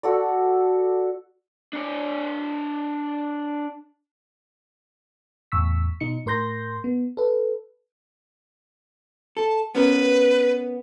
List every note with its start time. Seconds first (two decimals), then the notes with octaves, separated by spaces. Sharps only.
0.03 F#4 A4 D5
1.73 D4 C#5
5.52 E2 A2 C#6 E6 B6
6.00 B2 D#4 C#7
6.26 A2 A#4 C6 G6 A#6
6.84 B3
7.17 A4 B4
9.37 A4 A5
9.75 B3 C#4 A#4 B4